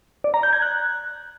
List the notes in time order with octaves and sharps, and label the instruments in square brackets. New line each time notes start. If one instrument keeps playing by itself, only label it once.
[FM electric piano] D5
A#5
G6
G#6
F#6